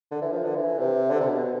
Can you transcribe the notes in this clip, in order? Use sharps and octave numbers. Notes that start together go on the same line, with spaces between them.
D3
E3
F3
D3
E3
C3
D3
C3
B2